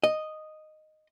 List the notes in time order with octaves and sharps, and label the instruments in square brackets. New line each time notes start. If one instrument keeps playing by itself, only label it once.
[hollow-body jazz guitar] D#5